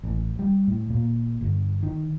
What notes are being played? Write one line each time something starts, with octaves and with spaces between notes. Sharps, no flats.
A1
G3
A2
A#2
G1
D#3